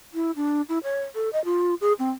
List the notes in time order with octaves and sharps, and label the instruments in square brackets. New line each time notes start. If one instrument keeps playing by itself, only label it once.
[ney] E4
D4
E4
C#5
A4
D#5
F4
G#4
C4